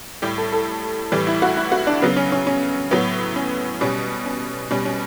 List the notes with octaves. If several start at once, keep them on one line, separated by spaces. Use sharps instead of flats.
A2 G3 G4
A4
A4
A2 E3 G3
E4
F#4
E4
F#4
D4
C#3 F#3 B3
C#4
C#4
C#4
A2 F#3 B3
C#4
B2 G3 C#4
C#4
B2 G3 C#4
C#4